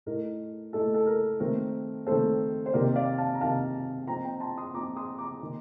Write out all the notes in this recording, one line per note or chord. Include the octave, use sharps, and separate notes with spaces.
A2 A3 D#4 A#4
A2 A3 D#4 A4
A4
A#4
D#3 A3 C4 A#4
D#3 A3 C4 A4 C5
C5
C3 D#3 A#3 D#4 A#4 D5
D5 F5
F5 A5
A#5
C3 D#3 A#3 D#4 F5 A5
F3 C4 D#4 G5 A#5
G5 A#5
A5 C6
C6 D#6
F3 C4 D#4 A#5 D6
C6 D#6
A#5 D6
D#3 A#3 D#4